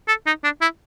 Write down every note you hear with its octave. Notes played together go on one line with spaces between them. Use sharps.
A4
D#4
D4
E4